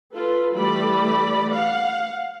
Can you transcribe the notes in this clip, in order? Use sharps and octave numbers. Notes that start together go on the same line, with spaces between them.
F4 A4 B4
E3 G3 A3 D5 B5
F5 F#5